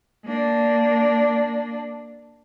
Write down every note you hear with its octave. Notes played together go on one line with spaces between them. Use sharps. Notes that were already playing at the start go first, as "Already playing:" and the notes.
A#3 D4